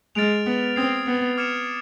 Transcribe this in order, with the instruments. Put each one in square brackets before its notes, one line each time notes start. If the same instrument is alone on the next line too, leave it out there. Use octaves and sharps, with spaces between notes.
[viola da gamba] G#3 [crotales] F6 A6 D7 F7
[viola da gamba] B3
[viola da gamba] C4 [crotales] D#6 G#6 C7
[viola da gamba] B3
[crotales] D6 F6 G#6 C#7 E7